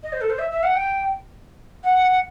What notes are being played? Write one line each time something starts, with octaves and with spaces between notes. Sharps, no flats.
D#5
C5
A4
C5
E5
E5
F#5
G5
F#5